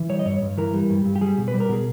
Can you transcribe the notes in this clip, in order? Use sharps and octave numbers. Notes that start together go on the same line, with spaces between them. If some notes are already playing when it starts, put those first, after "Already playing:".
Already playing: E3
G3 C#5
D#5
G2 C#5
G2
E3 A#4
G3
G2
G2
G4
G3 G#4
B2
B4
G3
A#4
B2 G#4